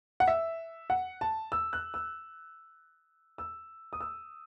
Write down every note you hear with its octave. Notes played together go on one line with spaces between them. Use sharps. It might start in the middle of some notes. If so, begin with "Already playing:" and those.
F#5
E5
F#5
A5
E6
F#6
E6
E6
D#6
E6